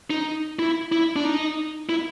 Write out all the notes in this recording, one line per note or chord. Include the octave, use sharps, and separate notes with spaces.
D#4
E4
E4
D4
D#4
E4